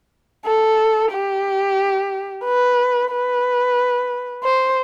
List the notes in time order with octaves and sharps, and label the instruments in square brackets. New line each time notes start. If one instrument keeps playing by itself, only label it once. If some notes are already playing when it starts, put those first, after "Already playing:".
[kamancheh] A4
G4
B4
B4
C5